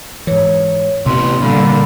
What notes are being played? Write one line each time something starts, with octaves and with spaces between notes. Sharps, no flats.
G#2 E3 C#5
A2 C3 B3 B4 C6
A#2 D3 G3 B5